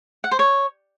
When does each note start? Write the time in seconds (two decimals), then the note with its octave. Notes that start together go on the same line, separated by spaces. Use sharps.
0.24 F#5
0.31 C5
0.39 C#5